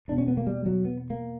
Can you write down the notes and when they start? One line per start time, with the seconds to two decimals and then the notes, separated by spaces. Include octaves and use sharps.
0.08 E2 B2 D4
0.18 C#4
0.28 B3
0.37 A#3
0.47 G3
0.66 F#3
0.85 B3
1.10 A#3